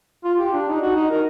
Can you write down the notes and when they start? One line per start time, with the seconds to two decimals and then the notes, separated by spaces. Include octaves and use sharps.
0.24 F4
0.39 G4
0.53 D4
0.69 D#4
0.82 F#4
0.95 D#4
1.11 A#4